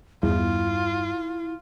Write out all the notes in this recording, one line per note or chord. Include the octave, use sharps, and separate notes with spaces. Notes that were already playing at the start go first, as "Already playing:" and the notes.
E2 G2 G3 E4 F4